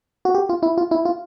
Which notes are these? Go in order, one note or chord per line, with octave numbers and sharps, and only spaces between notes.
F#4
G4
F4
E4
F4
E4
F4